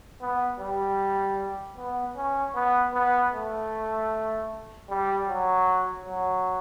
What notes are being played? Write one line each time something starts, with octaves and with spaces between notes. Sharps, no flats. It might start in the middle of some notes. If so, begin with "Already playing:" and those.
B3
G3
B3
C#4
B3
B3
A3
G3
F#3
F#3